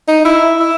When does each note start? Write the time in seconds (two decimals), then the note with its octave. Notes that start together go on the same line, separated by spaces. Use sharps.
0.08 D#4
0.25 E4
0.60 E4